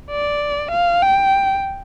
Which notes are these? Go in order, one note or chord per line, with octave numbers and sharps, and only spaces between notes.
D5
F5
G5